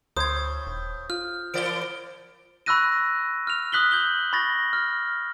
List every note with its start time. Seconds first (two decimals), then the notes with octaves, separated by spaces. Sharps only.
0.17 D2 A2 C5 D#6 G#6
0.67 D#1
1.10 F4 F6
1.54 E3 A#4 D5 D7 G7
2.66 B5 C#6 E6 F#6 A#6 D#7
3.47 F6 F7
3.72 D#6 F#6 B6 F#7 G7
3.91 G6 F#7 G7
4.33 B5 C#6 A6 A#6
4.73 F6